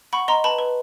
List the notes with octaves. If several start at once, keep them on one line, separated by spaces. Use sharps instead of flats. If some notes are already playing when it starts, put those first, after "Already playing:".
F#5 B5 C#6
D#5 A#5 C6
B4 A5 B5
B4